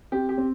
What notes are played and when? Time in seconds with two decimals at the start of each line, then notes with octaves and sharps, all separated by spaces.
0.12 C4 G4
0.29 G4
0.38 C4